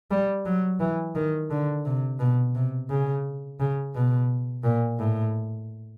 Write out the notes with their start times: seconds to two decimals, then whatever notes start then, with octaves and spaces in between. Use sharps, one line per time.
0.11 G3
0.45 F#3
0.80 E3
1.15 D#3
1.50 D3
1.85 C3
2.19 B2
2.55 C3
2.90 C#3
3.60 C#3
3.94 B2
4.64 A#2
4.99 A2